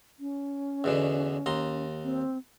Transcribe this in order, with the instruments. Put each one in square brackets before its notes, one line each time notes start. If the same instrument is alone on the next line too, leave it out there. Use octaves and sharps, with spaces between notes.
[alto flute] C#4
[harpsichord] E2 B2 D3
D#2 A#5 C6
[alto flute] C4